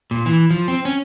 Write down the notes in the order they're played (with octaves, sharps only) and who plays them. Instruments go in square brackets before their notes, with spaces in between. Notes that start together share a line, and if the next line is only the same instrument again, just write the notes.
[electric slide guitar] A#2
E3
F3
C4
C#4